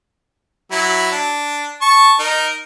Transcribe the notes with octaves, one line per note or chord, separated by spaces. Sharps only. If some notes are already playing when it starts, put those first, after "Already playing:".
F#3 E4
D4
A5 C#6
D#4 A#4